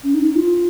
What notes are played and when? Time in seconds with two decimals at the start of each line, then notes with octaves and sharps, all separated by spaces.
0.03 C#4
0.14 D#4
0.24 D#4
0.35 F4